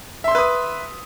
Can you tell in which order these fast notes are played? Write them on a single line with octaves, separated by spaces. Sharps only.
E5 C6 E6 B4 D#6